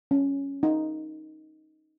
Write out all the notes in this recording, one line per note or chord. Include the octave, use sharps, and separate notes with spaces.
C#4
D#4